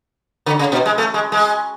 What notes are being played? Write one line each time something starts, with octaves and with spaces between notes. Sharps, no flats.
D3
C#3
B2
G#3
A3
G#3
G#3